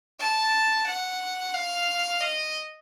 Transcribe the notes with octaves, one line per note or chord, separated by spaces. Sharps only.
A5
F#5
F5
D#5